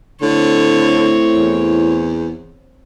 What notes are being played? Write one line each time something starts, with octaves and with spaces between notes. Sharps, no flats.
A2 D3 C4 C#5
E2